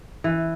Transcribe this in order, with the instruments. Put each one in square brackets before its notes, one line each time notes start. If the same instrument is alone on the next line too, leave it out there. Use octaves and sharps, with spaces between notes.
[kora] E3